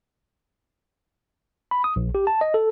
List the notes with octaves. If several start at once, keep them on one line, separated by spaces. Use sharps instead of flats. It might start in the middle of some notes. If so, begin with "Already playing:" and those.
B5
D#6
A#1
G4
A5
D#5
A4